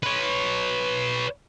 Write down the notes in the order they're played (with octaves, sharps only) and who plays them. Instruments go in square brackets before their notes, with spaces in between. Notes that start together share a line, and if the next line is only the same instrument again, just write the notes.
[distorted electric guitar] B4 C#5